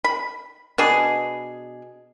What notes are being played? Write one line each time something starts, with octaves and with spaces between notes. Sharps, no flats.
B5
B2 D4 G#4